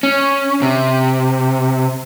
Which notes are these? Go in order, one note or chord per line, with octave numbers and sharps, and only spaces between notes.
C#4
C3